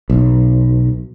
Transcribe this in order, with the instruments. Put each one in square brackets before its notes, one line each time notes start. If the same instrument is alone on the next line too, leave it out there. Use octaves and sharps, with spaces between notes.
[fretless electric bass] B1